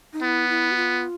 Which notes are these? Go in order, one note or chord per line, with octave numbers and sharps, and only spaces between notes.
D#4
B3 E4
E4
F#4
F4